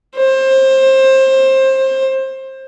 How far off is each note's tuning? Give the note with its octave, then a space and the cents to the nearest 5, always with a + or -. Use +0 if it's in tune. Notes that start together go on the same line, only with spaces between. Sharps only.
C5 +25